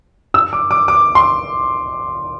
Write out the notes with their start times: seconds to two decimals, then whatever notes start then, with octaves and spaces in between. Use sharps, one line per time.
0.34 E6
0.53 D6
0.71 D6
0.88 D6
1.15 C6